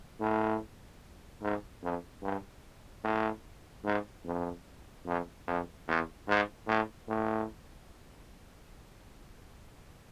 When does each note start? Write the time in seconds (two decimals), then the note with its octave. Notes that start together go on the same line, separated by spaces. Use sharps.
0.21 A2
1.42 G#2
1.83 F2
2.23 G2
3.04 A2
3.85 G#2
4.26 F2
5.07 F2
5.47 F2
5.88 E2
6.28 G#2
6.68 A2
7.08 A2